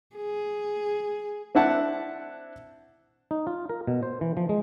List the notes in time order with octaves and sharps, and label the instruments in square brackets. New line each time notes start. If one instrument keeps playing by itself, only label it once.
[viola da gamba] G#4
[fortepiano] C4 D4 E4 E5 F#5 A5
[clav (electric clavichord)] D#4
F4
A#4
B2
C5
E3
F3
G#3